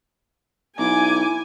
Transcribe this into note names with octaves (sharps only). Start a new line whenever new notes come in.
B1 E4 G#5 D6